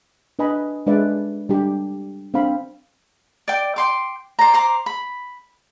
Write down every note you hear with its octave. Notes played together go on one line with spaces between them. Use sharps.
D4 B4 D#5 G#5 B5
G#3 D4 B4 D5 E5
G3 D4 G4
C4 D4 F5 B5
D5 G5
G5 C6 D6
C5 D5 A#5
C5 A#5 C6 D6
B5